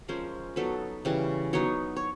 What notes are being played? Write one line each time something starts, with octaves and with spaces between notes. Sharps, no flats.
F3 G#3 C#4 A#4 C5
F#3 B3 D#4 A4 B4
C#3 E3 G3
F#3 B3 D#4 C#5 D#5
C#5